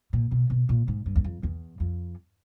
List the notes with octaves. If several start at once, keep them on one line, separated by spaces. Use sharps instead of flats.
A#2
B2
B2
A#2
G#2
G2
E2
F2
E2
F2